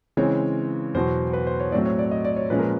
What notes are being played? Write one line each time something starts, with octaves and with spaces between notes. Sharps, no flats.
C#3 E3 G#3 C4 C#5
E2 B2 F#3 C5
B4
C5
C#5
A2 F#3 A3 C4 D5
C#5
D5
D#5
D5
C#5
A#2 F3 G#3 C#4 B4
A#4